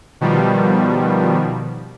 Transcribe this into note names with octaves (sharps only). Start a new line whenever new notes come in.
B2 D#3 F3 G3